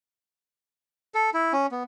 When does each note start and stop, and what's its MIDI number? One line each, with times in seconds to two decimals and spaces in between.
1.14 1.30 69
1.34 1.53 64
1.53 1.67 61
1.71 1.83 59